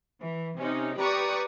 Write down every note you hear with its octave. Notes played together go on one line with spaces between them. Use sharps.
E3
C3 C#4 D#4
G4 B4 D5 A#5 C#6 D#6